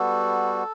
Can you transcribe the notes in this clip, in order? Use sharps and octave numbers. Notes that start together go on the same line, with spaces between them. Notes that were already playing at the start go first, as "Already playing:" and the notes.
Already playing: G3 B3 F#4 A4